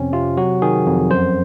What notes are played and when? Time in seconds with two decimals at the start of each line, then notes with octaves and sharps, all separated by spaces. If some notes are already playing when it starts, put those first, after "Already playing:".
Already playing: F2 C3 C4 C#4
0.13 C3 F4
0.37 F#3 F#4
0.62 D#3 G#4
0.86 F2
1.10 F#2 C5